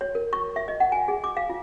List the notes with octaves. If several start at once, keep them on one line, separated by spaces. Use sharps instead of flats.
C#5
A#4
C#6
E5
D#5
F#5
G#5
G#4
D6
F5
F4